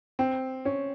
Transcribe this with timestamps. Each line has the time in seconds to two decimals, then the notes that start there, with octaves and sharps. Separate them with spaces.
0.19 C4
0.65 C#4